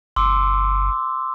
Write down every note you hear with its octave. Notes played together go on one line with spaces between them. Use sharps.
G1 C6 D6 E6